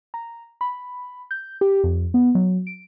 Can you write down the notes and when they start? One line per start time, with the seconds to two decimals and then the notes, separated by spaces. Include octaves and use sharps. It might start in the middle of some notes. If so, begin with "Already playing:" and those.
0.14 A#5
0.61 B5
1.31 G6
1.61 G4
1.84 F2
2.14 B3
2.35 F#3
2.67 D7